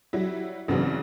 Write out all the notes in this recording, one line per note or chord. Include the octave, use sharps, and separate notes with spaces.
F#3 G3 E4
A1 C#3 F#3 B3 C4 D4